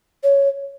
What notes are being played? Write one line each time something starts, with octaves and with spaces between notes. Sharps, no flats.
C#5